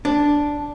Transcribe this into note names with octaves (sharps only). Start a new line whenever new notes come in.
D4